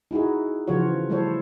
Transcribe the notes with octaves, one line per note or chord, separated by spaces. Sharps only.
D#4 E4 F#4 G#4
C#3 E3 F3 F4 F#4 C#5
G3 A3 E4 A4 C5 C#5